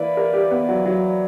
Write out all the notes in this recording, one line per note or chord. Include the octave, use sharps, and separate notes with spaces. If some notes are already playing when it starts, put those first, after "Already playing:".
Already playing: E3 A#3 E4 B4 D5
A#4
G4
B3
F#3
F#3